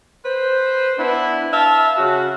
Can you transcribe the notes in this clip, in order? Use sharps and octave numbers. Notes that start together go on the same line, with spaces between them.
B4 C5
B3 D4 E4
E5 F5 A5
C#3 F#4